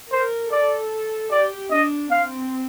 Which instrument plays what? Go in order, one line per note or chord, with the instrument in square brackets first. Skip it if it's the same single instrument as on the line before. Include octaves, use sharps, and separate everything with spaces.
[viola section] A#4 [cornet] C5
[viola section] A4 [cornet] D5
[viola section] G4 [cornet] D5
[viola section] D4 [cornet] D#5
[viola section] C4 [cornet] F5